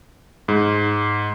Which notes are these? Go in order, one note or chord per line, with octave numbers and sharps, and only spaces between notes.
G#2